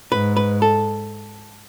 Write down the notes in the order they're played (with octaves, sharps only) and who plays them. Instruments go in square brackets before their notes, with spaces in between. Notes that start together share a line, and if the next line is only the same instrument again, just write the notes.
[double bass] G#2 [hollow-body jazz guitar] B4
[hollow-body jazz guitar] B4
A4